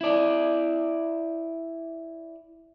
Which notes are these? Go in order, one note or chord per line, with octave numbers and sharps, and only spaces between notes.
E4 D5